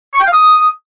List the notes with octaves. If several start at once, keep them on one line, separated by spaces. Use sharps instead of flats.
C#6
G5
F5
D#6